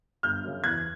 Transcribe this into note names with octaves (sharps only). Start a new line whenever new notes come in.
G1 F6 G6
F#2 C#3
E2 F#6 G#6